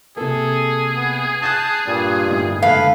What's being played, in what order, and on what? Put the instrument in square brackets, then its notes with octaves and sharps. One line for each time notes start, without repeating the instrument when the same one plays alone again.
[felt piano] C3 A#3 [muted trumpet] G#4 [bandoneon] A4
[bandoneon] B3
[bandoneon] A5 [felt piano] F#6 G6 A6
[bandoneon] G2 A#2 G3
[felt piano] G1 A2 D#4
[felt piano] F#1 D3 G#3 [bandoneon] A4 B4 B5 [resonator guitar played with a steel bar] F5